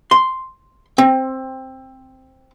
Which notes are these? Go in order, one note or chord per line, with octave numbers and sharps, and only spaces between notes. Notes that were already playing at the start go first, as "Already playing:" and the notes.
C6
C4